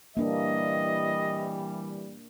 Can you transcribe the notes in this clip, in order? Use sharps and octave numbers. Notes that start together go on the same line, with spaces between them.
E3 G3 A#3 D4 D#5